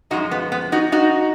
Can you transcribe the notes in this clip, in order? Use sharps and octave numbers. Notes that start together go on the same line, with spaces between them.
F#2 F3 G#3 D#4 F#4
B3
B3
D#4 F#4
D#4 F#4